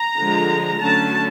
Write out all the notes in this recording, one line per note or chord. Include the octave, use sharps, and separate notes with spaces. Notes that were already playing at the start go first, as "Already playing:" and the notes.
Already playing: A#5
D3 F3 G#3
D3 F#3 A3 C#4 A5